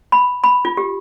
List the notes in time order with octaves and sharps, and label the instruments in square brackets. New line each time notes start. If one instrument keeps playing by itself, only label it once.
[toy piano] B5
B5
F4
G4